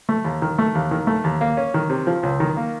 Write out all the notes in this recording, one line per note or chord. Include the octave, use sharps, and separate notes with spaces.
A3
D#2
D#3
A3
D#2
D#3
A3
D#2
A#3
C#4
D#3
C3
F3
C#2
D#3
A#3